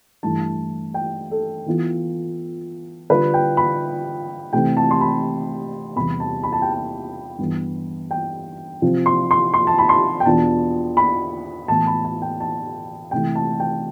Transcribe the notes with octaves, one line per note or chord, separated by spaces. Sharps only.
G2 E3 A3 E4 A5
G5
A4
E3 B3 F4
D3 G3 D4 F4 B4
G5
B5
C3 E3 A3 C4 E4 G5
A5
C6
B5
E2 C3 G3 B3 B5
A5
B5
A5
G5
A5
G2 E3 B3
G5
C3 F3 C4 F4
C6
C6
C6
A5
B5
C6
G5
E2 B2 B3 D4 F4 A5
B5
A2 E3 B3 A5
B5
A5
G5
A5
C3 E3 A3 E4 G5
A5
G5